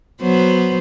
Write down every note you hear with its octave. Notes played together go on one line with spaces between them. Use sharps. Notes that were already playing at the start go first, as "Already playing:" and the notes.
F#3 B3 C5